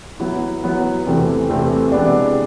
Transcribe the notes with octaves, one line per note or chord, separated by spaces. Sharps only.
F#3 B3 E4
F#3 B3 E4
E2 C3 E3 A3 C4
E2 C3 E3 A3 C4
C3 E3 G#3 B3 D4